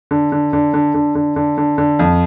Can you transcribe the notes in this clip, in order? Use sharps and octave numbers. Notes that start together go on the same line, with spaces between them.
D3
D3
D3
D3
D3
D3
D3
D3
D3
F2